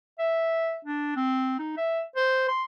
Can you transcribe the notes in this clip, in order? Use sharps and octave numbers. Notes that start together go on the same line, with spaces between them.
E5
D4
C4
D#4
E5
C5
C6